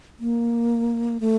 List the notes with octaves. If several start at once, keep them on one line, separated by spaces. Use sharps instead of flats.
A#3
A3